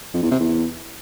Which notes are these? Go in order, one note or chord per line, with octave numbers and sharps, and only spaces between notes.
F2
E2
C3
E2